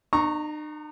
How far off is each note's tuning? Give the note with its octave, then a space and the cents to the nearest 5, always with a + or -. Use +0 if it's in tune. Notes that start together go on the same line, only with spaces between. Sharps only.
D#4 -45 A#5 +0 C#6 -10